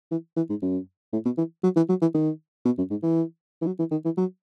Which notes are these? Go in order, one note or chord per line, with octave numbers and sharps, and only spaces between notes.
E3
E3
G#2
F#2
A2
B2
E3
F#3
E3
F#3
E3
D#3
B2
F#2
G#2
E3
E3
F#3
E3
D#3
E3
F#3